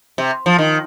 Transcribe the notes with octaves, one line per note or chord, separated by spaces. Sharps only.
C3
F3
D#3